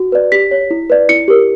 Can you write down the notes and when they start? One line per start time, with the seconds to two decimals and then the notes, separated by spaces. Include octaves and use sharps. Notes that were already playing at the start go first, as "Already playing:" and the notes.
Already playing: F#4
0.12 B4 D5
0.32 G4 B6
0.51 C#5
0.71 E4
0.90 B4 D5
1.09 E4 C#7
1.28 G4 A#4